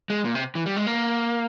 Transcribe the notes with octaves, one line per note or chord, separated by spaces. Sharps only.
G#3
A#2
C3
E3
G3
G#3
A#3